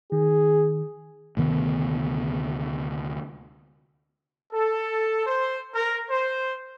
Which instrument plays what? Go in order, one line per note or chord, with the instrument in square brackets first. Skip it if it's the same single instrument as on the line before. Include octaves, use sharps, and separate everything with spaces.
[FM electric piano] D#3 [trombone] G#4
[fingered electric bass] D2 C3 D#3 B3
[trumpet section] A4
C5
A#4
C5